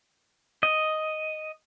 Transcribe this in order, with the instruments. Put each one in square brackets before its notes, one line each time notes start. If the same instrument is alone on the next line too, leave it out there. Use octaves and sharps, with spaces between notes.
[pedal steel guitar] D#5